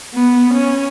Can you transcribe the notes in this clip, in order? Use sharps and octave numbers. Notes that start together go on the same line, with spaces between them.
B3
C#4